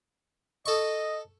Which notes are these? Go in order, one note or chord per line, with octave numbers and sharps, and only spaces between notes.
A4 D#5 C#6